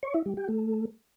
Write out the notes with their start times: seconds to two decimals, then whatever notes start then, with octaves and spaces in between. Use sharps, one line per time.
0.03 C#5
0.14 E4
0.26 G3
0.37 G4
0.48 A3